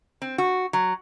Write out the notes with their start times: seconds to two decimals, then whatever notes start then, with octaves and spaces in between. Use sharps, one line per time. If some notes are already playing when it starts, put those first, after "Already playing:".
0.22 C4
0.38 F#4
0.73 F#3